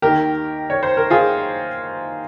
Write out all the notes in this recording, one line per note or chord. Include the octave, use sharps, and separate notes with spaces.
D#2 D#3 G4 A#4
C#5
C5
A#4
F4 G#4